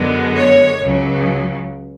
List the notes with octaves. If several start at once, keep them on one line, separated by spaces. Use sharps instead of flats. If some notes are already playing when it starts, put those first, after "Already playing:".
Already playing: F#2 D3 G#3 B3
C#5
C#2 C#3 F#3